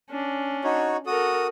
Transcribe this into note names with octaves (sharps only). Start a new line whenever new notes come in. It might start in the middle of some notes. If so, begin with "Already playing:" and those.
C#4 D4
D#4 F#4 C#5
F#4 A4 A#4 D#6